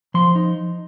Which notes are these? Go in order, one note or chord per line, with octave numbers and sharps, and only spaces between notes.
F3 C6
D#4